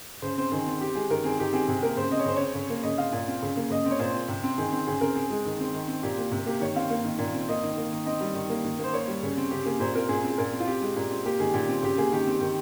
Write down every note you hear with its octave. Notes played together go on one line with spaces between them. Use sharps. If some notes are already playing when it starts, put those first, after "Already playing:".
C#3 C5
C4 C5
D#3 G#4
C4
C4 G4
G#3 G#4
D#3 A#4
C4 G#4
D#3 G4
C4 G#4
C3 G#4
A#3 A#4
C#3 C5
C4 D#5
C#5
C#3 C5
C4 C#5
C#3
A#3
C#3 D#5
C4 F5
A#2
C4
C#3
A#3
C#3 D#5
C4
C#5
A#2 C5
C4
C3
C4
D#3 G#4
C4
C#3 G#4
C4 A#4
C4 G#4
G#3
D#3
C4
D#3
C4
A#2 G4
A#3
C3
A#3 G4
D#3 C#5
C4 F5
A#3
D#3
A#2
C4
A#3 D#5
D#3
A#3
D#3
C4 D#5
G3
D#3
A#3
D#3
A#3 C5
A#3 C#5
G3
C#3
C4
C#3 G4
A#3 G#4
A#2 C5
C4 A#4
A#2 G#4
C4
G#4
A#2 A#4
C4
F4
C4 G4
G#3
A#2
C4
A#3 G4
D#3 G#4
A#2 G4
C4
C#3 G4
A#3 G#4
D#3 G4
C4
D#3